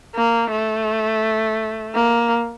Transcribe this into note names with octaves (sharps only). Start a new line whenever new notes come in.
A#3
A3
A#3